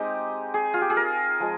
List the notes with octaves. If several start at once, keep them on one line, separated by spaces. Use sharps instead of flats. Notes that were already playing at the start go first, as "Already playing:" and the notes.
Already playing: G#3 C4 D#4 G4
G#4
F4
G4
G#4
A#4
F3 G#3